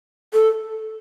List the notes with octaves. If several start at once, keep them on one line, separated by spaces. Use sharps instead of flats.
A4